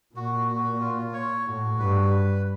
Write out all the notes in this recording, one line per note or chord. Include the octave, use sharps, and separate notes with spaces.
A#2 F#4
F#4
F4
C#5
A2 F#4
G2 B4